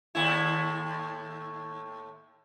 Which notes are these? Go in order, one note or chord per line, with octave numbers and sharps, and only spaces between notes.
D#2 A2 E4